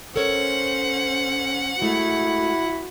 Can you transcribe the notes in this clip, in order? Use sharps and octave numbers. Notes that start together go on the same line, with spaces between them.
C#4 A4 A#4 C5 C#5 F#5
G#3 A3 E4 F#4